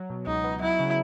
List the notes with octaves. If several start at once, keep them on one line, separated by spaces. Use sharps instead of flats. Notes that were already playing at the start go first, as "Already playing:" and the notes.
Already playing: F#3
B2
C#2 D#4
B3
F#3 E4
C#3